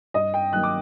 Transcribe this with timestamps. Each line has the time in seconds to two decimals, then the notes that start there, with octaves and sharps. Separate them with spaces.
0.14 G2 D#5
0.34 G5
0.52 D#3 F#3 A#3 F#6
0.63 D6